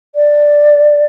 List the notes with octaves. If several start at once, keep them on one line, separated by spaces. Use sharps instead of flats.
D5